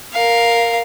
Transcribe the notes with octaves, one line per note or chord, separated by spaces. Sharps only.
A#4 F5